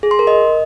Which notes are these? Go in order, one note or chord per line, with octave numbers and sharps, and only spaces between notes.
G#4
C6
A#4
D#5